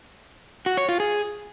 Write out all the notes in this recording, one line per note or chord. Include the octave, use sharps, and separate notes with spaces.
F#4
C#5
F4
G#4